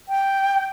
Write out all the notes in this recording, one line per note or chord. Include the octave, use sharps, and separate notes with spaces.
G5